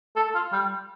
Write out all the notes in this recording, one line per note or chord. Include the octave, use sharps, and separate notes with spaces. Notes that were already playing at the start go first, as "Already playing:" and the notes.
A4
F4
G3